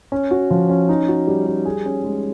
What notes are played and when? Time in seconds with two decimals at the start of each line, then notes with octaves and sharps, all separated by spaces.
0.12 C#4
0.31 F#4
0.51 F3
0.69 C#4
0.89 D#4
1.08 F#4
1.27 G3
1.46 G3
1.65 G#4
1.86 C#4
2.04 G#3